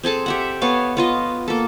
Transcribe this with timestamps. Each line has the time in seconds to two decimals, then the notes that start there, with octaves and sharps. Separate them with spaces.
0.03 C4 G#4 A4 A5
0.26 G4 E5 F#5
0.61 B3 A4 C#5 F5
0.97 B3 F4 D#5
1.48 A#3 A4